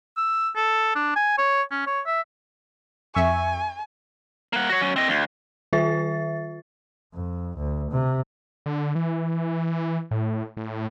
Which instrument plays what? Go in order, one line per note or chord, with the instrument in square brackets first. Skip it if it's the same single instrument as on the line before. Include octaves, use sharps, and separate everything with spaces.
[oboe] E6
A4
D4
G#5
C#5
C#4
C#5
E5
[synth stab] F2 E5 C#6 [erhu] G#5
[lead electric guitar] A#3 F#5
F#4 C#5
F#3 C#4
C4 D#5
D2
[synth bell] D#3 F4 E5 A6
[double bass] F2
D2
C3
[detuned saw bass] D3
E3
A2
A2